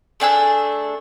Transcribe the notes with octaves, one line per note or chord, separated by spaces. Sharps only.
A3 D4 G#4 E6